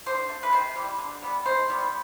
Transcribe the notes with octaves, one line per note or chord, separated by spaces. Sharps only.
D3 C5
A3
B4
C3 C5
E3 G3
D3
G3 B3
B2 C5
G3 B3